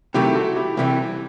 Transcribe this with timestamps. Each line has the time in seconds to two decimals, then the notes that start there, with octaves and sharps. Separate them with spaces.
0.14 C3 D#3 F#3 A3 E4 G4
0.36 F#4 A4
0.56 E4 G4
0.77 C2 C3 E3 G3 E4 G4